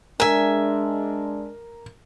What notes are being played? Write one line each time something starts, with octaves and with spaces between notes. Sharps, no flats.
G#3 D4 A#4 E5 G#5